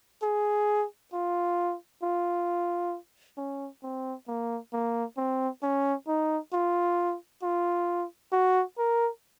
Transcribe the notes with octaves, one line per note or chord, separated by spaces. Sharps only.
G#4
F4
F4
C#4
C4
A#3
A#3
C4
C#4
D#4
F4
F4
F#4
A#4